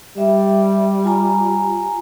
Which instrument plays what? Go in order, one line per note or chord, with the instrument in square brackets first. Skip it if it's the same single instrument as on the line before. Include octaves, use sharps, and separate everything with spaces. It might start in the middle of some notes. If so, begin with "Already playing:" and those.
[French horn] G3 [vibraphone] E5
[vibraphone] F4 G#5 A#5